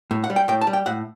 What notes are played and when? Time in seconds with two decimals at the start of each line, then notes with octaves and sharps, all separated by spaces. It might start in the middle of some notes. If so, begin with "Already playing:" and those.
0.11 A2
0.24 F#5
0.30 G3
0.36 G5
0.48 A2 G5
0.61 A5
0.67 G3
0.73 G5
0.86 A2 F#5